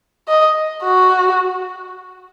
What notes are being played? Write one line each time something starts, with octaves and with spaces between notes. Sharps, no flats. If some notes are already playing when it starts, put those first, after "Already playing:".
D#5
F#4